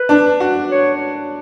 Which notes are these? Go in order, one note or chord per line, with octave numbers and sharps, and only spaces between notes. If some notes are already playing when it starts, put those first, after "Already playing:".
Already playing: B4
D4
F#4
C#5